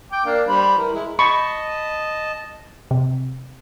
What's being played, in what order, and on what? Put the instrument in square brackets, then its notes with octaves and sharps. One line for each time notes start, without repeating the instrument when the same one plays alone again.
[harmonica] G5 D6
A#3 D4 F5
G3 C5 B5
E3 A#4
G#3 E4
[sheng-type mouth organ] D#5 A5 [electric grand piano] B5 [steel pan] C#6
[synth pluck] C3